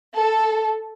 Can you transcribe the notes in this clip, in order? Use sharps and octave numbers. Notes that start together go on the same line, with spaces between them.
A4